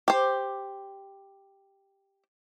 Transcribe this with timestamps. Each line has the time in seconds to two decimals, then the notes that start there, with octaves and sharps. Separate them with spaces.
0.08 G4 C5